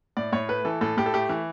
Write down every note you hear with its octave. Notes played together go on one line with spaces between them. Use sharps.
A2 D5
A2 C#5
A3 B4
E3 A4
A2 A4
A2 G4
A4
A3 G4
E3